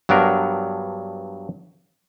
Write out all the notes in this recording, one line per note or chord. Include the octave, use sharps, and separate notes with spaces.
G2 F#3 B3 D4 A#4